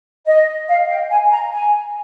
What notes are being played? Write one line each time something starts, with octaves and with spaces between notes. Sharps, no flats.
D#5
F5
G5
G#5
A#5
G#5